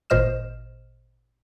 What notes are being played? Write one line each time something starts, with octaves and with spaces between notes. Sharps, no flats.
G#1 A#2 C5 D#5 F6 E7